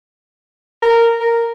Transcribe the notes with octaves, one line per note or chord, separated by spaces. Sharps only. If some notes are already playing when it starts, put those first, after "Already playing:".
A#4
A#4